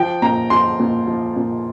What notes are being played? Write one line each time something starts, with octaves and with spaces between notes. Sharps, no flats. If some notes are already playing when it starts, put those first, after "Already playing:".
Already playing: F3 G5
A#2 A#5
F3 C6
A#2
F3
A#2